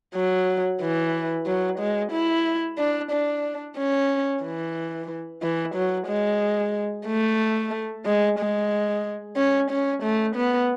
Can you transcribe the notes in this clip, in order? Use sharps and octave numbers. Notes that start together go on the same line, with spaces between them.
F#3
E3
F#3
G#3
E4
D4
D4
C#4
E3
E3
F#3
G#3
A3
G#3
G#3
C#4
C#4
A3
B3